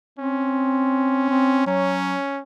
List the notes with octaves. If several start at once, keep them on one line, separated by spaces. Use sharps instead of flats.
C4 C#4
C4
F#3 C#4